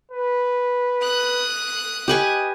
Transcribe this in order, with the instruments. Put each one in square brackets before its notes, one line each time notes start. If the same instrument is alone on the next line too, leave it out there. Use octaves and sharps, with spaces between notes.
[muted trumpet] B4
[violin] D#6 F#6
[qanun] G4 B4 G#5 [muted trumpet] D#5